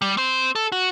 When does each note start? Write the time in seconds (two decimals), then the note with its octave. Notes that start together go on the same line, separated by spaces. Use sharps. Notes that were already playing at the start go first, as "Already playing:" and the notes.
0.02 G3
0.17 C4 C5
0.55 A4
0.72 F#4